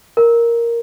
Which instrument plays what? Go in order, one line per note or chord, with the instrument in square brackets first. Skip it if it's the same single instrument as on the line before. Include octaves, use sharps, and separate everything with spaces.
[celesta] A#4